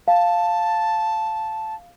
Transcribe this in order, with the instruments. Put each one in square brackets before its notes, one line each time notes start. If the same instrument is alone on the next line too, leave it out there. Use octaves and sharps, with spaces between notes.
[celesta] F5 [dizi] A5